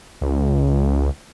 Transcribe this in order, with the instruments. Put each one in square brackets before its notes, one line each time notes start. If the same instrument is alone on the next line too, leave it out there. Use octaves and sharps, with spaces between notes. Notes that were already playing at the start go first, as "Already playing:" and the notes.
[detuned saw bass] C#2